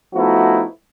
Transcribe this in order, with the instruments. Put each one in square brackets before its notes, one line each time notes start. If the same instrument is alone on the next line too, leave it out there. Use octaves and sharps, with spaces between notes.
[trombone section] F3 A3 B3 D#4 E4 F#4